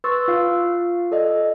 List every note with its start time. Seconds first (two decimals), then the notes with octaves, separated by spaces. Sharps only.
0.04 B4 C6 C#6 E6 A6
0.28 F4 F5
1.12 A4 D5 D#5